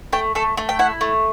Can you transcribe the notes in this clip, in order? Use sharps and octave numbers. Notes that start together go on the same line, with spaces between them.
A3 G5
A3 A4
A3
G5
E4 F#5
A3